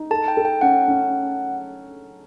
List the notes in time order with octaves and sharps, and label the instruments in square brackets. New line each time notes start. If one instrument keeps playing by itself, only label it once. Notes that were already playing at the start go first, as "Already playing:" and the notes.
Already playing: [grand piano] D#4
[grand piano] A4 [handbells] A5
[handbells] G5
[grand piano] A4
[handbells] G5
[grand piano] C#4 [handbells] F#5
[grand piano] C#4